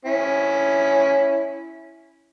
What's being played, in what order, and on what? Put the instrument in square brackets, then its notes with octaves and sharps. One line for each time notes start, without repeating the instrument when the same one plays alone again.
[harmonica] C#4 E4